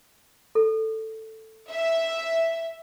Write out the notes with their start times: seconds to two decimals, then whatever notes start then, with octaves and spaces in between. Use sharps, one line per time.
0.55 A4
1.70 E5